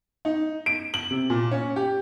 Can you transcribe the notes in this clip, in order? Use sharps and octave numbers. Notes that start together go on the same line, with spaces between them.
D#4
D7
F#7
C3
A#2
C#4
G4